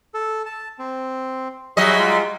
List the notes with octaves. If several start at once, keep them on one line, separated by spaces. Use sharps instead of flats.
A4
A5
C4
F#3 G3 G#4 D#5 E5 C#6
G#3 F4